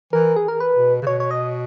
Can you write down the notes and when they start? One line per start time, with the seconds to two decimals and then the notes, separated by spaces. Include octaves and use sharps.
0.13 E3 A#4
0.36 G#4
0.48 A#4
0.60 B4
0.75 B2
1.02 C#3
1.07 B2 C#5
1.20 C#5
1.31 D#5